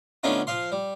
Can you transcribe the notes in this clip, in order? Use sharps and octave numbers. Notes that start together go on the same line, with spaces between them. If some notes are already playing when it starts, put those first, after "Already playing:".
D3 A3 B3 C#4 D#4 F4
F3 F5 C6
G3